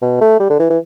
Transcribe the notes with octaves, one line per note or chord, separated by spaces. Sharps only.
B2
A3
G3
D3
E3
E3